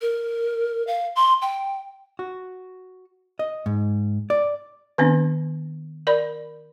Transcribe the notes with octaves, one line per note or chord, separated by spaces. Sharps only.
A#4
F5
C6
G5
F#4
D#5
G#2
D5
D#3 B3 C4 D4
A#4 D5 B5